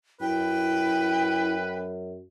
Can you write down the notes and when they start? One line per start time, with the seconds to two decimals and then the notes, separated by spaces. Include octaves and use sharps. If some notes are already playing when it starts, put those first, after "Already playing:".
0.20 F#2 E4 B4 G5